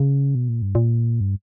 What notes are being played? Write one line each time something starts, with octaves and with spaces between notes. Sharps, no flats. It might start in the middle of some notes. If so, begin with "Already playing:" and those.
Already playing: C#3
B2
A#2
G2
A#2
G2